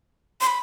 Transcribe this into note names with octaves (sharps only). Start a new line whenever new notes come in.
C6
B5